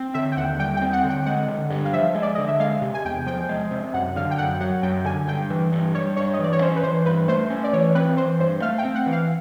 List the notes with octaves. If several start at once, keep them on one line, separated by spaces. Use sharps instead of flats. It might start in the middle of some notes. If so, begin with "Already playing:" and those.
Already playing: C4
D3 E5
G5
D#2 F#5
G3 G5
G5
C4
F#5
D3
G5
G#3 F#5
D3
G2
F5
F3 E5
G#3
D5
D3 D#5
E5
G#3 F5
C3
G#5
E2 G5
F3 G5
G#3
C3
F#2 F#5
D3 F5
G5
F#2 F#5
F#3 F#5
F#2 G5
D3 G#5
G2 G5
E3
G2
G3 C#5
G2 C#5
D#5
E3 D5
C#5
C#4 C5
B4
E3 C5
G2 B4
A3 C5
C#4
D5
E3 C#5
C4 B4
E3 C5
G2 C5
A3 F5
G5
C4
F#5
E3
F5